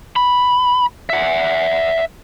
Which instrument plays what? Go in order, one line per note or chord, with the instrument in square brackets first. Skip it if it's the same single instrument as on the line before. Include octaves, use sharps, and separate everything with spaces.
[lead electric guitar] B5
E5 F#5